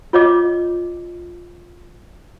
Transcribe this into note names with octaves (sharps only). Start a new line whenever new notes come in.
F4 C#5 D#5 D6